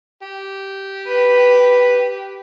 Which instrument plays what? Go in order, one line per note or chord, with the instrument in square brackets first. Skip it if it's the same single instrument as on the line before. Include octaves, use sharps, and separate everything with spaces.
[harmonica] G4
[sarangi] B4